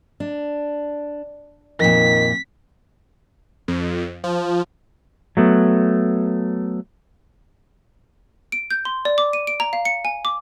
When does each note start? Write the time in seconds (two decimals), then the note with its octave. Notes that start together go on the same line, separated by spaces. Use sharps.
0.20 D4
1.80 F2 A#2 D#3 B6
3.68 F2
4.24 F3
5.37 F#3 A3 B3
8.52 D7
8.70 G6
8.85 C6
9.05 D5
9.18 D6
9.33 D#7
9.47 D7
9.60 A#5
9.73 F5
9.85 C#7
10.05 G#5
10.25 D6